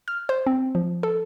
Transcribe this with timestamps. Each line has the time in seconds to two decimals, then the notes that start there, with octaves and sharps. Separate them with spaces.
0.08 F6
0.29 C5
0.47 C4
0.75 F3
1.03 A4